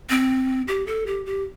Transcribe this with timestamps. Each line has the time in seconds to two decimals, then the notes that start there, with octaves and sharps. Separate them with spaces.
0.10 C4
0.68 G4
0.87 A4
1.07 G4
1.26 G4